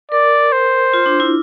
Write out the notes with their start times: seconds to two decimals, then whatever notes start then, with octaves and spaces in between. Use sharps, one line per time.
0.12 A#4 D5
0.52 C5
0.94 F4
1.06 D4
1.20 E4